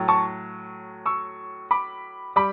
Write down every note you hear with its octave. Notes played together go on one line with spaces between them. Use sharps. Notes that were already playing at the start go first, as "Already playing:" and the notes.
Already playing: A2 F#3
A5 C#6
C#6 E6
B5 D6
G3 B5 D6